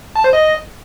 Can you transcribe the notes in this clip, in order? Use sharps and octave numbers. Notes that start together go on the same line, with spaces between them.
A5
C5
D#5